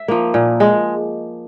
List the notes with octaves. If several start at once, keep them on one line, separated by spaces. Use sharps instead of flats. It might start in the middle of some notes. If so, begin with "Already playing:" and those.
Already playing: E5
F3 A#3
A#2
G#3